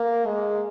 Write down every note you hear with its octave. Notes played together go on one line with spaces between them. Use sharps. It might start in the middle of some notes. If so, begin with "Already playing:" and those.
Already playing: A#3
G#3